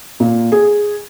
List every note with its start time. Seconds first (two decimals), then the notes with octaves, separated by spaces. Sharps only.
0.20 A#2
0.52 G#4